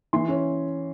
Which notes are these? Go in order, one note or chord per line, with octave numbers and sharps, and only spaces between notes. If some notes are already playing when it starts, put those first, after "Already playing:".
E3 C6
C#4